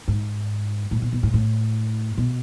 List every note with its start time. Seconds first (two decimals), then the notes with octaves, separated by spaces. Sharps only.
0.08 G#2
0.91 A2
1.02 B2
1.13 B2
1.23 A2
1.34 A2
2.18 B2